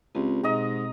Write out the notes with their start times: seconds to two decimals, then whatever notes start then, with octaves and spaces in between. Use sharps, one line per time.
0.15 C#2 C4 G4 G#4
0.43 G#2 B2 D#5 A#5